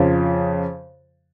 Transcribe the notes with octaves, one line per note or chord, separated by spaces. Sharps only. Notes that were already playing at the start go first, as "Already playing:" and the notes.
Already playing: F2 C#3 F3